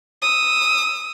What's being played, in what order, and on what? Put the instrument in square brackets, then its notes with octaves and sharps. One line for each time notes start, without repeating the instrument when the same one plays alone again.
[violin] D#6 E6